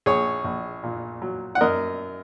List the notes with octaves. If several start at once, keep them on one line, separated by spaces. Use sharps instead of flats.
A#1 G#4 C#5
A#1
A#2
F#3
F#5
F#2 A#4 D#5